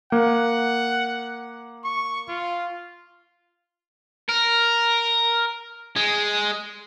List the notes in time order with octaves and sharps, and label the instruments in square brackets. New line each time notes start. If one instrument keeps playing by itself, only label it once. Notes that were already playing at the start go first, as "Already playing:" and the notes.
[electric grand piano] A#3 [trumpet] F#5
[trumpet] C#6
F4
[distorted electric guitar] A#4
G#3